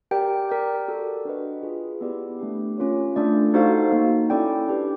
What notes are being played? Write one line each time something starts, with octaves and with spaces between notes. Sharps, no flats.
G4 A#4 D5 G5
G4 A#4 D5 G5
F#4 A4 D5
D4 F#4 B4 D#5
F4 G#4 B4
B3 E4 G4 B4 D5
A3 D4 G4
C#4 F4 A#4 C#5
A3 D4 F4 A4 D5
D#4 F#4 A4 C5 F5
A#3 D#4 F#4
C#4 E4 A4 D5 G5
D4 G4 B4